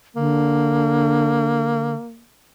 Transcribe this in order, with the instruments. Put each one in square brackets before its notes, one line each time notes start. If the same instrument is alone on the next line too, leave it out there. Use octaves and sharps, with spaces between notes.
[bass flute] D3 [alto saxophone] A#3